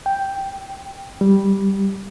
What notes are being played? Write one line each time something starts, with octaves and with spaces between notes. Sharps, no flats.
G5
G3